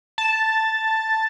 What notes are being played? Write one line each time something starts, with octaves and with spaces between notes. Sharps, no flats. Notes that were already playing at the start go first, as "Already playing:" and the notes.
A5